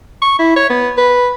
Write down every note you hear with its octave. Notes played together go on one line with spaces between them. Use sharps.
C#6
E4
C#5
B3
B4